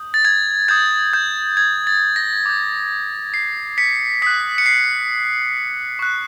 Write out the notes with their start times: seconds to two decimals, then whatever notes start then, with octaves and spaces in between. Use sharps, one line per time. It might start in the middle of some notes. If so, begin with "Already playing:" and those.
Already playing: D#6 G6
0.14 A6
0.25 G#6
0.68 D#6 G6 G#6
1.13 G6
1.57 G#6
1.87 A6
2.16 A#6
2.46 D6 G6
3.34 C7
3.78 B6 C#7
4.22 D#6 F#6 B6
4.58 C#7
4.66 C7
5.99 C#6 F#6